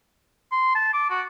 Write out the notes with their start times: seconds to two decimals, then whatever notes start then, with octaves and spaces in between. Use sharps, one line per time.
0.52 C6
0.75 A5
0.94 D6
1.10 F#4